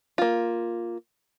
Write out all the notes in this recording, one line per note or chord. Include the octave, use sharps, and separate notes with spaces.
A#3 F4